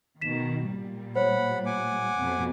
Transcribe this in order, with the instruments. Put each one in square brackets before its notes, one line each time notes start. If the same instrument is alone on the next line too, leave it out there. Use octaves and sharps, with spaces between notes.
[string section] B2 D#3 [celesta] B6 E7
[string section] A#2 G3
[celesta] C5 C#5 [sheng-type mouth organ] F#5 B5
[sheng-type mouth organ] F#5 G#5 D6
[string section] F2 B2 F3